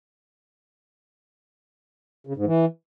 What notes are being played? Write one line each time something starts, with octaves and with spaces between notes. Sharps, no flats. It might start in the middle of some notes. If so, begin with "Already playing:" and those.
C#3
G#2
E3